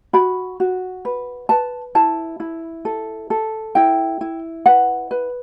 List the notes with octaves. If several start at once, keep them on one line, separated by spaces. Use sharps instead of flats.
F#4 B5
F#4
B4
B4 A5
E4 A5
E4
A4
A4
E4 G5
E4
B4 F#5
B4